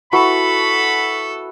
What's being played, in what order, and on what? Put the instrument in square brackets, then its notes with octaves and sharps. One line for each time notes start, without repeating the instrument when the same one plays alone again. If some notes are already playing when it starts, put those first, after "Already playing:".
[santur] E4 F#4 B4 [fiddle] A4 [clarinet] B5